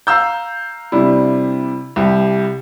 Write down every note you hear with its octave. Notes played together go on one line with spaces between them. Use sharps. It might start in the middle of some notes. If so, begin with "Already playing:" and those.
F5 A#5 E6 G6
C3 G3 D4 E4
C2 G4